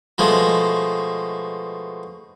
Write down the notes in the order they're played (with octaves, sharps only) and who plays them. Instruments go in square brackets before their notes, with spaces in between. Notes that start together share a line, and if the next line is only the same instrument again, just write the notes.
[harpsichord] B2 F3 G#3 A3